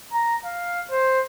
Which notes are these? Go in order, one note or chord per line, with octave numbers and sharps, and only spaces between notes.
A#5
F5
C5